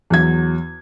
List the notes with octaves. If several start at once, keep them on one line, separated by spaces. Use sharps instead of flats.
E2 F#3 G#6